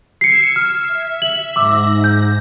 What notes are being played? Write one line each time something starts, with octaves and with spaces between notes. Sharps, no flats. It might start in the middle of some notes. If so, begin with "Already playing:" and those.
E6 G#6 C7 C#7
F6
E5
F#7
G#2 D6 E6 A#6
G6